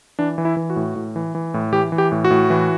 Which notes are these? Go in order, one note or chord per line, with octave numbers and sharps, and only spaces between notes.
E3 D4
E3
E4
E3
F#4
A2
A2
E3
E3
A2
E3 G4
E3
G4
A2
F#4
A2
E3